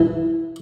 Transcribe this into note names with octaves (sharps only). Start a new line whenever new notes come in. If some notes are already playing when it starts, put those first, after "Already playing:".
Already playing: E3